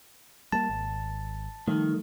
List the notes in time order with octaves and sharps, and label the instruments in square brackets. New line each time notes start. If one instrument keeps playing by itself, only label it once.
[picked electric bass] G3 A#3 [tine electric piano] A5
[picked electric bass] G#1
[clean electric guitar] D#3 [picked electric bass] F3 G3 A3